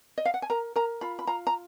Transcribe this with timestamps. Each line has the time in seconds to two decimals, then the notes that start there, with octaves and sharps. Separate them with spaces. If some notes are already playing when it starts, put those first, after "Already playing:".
0.18 D#5
0.25 F5
0.34 F#5
0.42 G#5
0.50 A#4 A#5
0.76 A#4 A#5
1.01 F4 B5
1.19 B5
1.27 F4 A#5
1.47 A#5